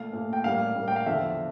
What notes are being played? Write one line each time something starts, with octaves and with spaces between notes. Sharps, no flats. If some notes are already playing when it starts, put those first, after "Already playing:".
Already playing: A#2 A3 F5
A#2 A3
G5
A2 G3 A#3 F5
A2 G3 A#3
G5
F5
E2 D3 F3 E5